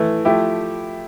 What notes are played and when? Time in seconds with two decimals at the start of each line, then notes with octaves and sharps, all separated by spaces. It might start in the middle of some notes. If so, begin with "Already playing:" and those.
Already playing: E3 A3 E4
0.25 F3 A3 E4 G4